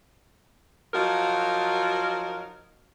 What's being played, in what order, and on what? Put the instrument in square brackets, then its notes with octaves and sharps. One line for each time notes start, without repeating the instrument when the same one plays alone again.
[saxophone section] F3 F#3 D#4 F4 F#4 A#4